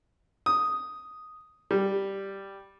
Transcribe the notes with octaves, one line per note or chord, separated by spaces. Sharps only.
D#6
G3